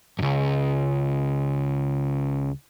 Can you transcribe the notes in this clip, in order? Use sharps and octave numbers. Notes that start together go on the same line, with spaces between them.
C#2 F#2